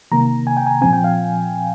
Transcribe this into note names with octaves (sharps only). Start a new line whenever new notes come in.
C3 D#3 A#3 A#5
G#5
G5
G#5
A#2 F3 C4 G#5
G5
F5